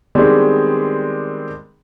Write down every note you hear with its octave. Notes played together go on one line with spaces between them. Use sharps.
D#3 G3 G#3 B3 C4 D4